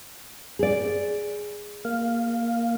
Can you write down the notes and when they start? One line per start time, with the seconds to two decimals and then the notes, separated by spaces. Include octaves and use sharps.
0.59 G#4 D5
1.85 A#3 F5